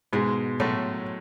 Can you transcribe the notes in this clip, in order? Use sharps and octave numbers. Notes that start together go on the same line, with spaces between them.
G#2 B2 G#3
A2 F#3 A3